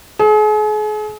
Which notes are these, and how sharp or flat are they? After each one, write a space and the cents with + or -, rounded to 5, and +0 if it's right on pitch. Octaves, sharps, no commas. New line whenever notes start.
G#4 +40